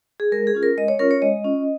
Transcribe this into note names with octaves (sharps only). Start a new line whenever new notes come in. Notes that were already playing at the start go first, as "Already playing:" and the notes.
G#4
G#3 A#4
G#4
C#4 F4
A#4
G#3 D#5
C#5
C#4 F4 A#4
C#5
G#3 D#5
C#4 F4